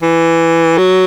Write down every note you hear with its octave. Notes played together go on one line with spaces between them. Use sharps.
E3
F#3